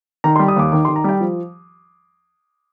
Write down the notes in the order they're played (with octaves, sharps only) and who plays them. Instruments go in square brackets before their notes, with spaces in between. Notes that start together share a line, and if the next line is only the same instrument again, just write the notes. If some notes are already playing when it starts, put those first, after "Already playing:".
[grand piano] D#3 A#5
C6
G3
D#6
D#2 D6
D#3 D6
C6
D#3
A#5
G3 G5
F3